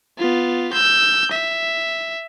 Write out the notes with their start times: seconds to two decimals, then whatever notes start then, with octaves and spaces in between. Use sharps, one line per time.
0.18 B3 F4
0.73 E6 G6
1.32 E5